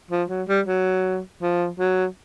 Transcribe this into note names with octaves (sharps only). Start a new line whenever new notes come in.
F3
F#3
G3
F#3
F3
F#3